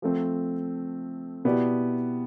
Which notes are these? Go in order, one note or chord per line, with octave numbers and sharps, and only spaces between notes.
F3 A3 C4
B2 B3 E4 G4 D5